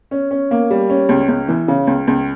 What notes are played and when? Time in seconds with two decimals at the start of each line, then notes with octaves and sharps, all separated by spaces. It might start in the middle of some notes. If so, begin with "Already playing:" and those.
0.11 C#4
0.31 C#4
0.51 A#3
0.71 G3
0.90 C#4
1.09 C#2
1.28 C#2
1.48 E3
1.68 C#3
1.87 C#2
2.08 C#2